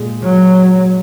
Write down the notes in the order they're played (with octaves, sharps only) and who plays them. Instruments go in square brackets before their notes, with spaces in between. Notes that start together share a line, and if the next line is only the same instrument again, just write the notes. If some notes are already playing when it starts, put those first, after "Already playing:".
Already playing: [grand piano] A#2 G#3
[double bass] F#3